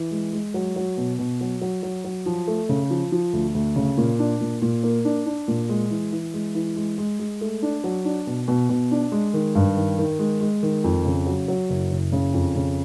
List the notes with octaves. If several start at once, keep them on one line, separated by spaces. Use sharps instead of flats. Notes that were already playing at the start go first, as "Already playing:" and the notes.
Already playing: E3
G#3
G#3
F#3
F#3
B2
B2
F#3
F#3
F#3
F#3
F3
A3
C#3
F3
F3
D2
D2
C#3
A#2
D4
A#2
A#2
A#3
D4
D4
A#2
G#3
E3
E3
G#3
E3
G#3
G#3
G#3
A3
D4
F#3
D4
B2
B2
B2
D4
G#3
D#3
G2
D#3
D#3
G#3
G#3
D#3
F2
C#3
F#3
F#3
F#1
F#1
C#3
F2
C#3